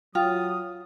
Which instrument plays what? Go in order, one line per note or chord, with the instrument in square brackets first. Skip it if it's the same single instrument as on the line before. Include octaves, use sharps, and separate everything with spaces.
[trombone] F#3 [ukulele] F4 [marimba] G5 [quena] D#6